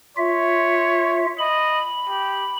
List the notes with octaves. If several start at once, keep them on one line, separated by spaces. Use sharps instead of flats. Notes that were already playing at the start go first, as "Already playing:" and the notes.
F4 C#5 E5
D#5 B5
G4